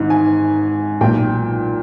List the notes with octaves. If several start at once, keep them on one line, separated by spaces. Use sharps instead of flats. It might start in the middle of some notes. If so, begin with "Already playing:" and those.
Already playing: G#1 G#2 D#3
G#5
B1 A#2 G5